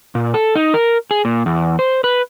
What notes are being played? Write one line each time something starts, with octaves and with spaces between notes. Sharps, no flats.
A#2
A4
D#4
A#4
G#4
A#2
E2
C5
B4